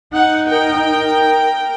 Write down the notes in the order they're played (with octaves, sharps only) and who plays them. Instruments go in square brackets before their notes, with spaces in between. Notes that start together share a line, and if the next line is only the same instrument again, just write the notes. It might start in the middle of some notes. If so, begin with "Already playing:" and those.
[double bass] D#4 [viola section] F#5
[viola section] A#4 G5